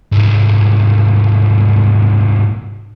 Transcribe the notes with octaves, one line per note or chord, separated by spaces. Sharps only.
C2 G#2